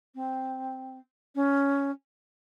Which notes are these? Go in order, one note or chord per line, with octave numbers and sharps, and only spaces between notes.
C4
C#4